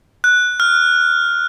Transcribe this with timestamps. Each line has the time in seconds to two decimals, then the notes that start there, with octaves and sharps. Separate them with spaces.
0.24 F#6
0.60 F6